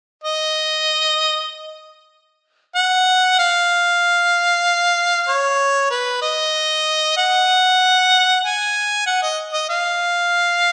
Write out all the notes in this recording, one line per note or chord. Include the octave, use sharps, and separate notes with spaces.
D#5
F#5
F5
C#5
B4
D#5
F#5
G#5
F#5
D#5
D#5
F5